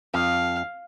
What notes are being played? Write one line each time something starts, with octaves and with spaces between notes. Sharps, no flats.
F2 F5